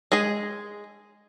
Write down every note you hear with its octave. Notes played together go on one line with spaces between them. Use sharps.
G#3 G#4